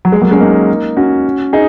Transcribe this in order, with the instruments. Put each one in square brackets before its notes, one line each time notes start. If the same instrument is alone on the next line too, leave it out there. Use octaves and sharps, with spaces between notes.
[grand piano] F#3
G#3
F#3 A#3
G#3 C#4
A#3 D#4
C#4 F#4
D#4 G#4